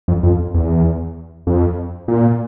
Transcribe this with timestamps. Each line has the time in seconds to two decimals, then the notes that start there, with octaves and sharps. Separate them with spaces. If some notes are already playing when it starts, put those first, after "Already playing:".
0.08 F2
0.23 F2
0.54 E2
1.47 F2
2.08 A#2